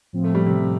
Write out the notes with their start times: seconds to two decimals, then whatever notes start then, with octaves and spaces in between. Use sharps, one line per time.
0.13 A2 F3 C4
0.24 A3
0.35 G3
0.46 C3
0.57 A2 F3 C4